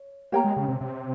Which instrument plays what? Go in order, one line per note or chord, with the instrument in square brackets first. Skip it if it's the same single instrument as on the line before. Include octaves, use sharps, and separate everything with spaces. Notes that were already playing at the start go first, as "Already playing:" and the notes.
Already playing: [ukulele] C#5
[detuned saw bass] A#3 [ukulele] G4 C#5 G5 A#5
[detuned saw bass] G#3
C#3
C3
C3